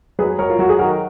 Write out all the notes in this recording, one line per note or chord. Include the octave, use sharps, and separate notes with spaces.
F#3 G#4 B4
F#3 A#4 C#5
F4
F#3 F#4
G#4
D#3 F#4 A#4